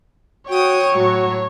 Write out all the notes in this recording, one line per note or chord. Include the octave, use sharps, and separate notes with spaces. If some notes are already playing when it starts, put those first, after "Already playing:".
F#4 C#5 G5 D#6
A2 F#3 F#4